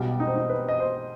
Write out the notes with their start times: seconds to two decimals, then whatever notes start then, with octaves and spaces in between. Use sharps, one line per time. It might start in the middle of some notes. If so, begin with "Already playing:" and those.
Already playing: B1 B2 G3 G4
0.20 D#4
0.27 C4
0.36 D#4
0.49 B4
0.69 D#5
0.80 C5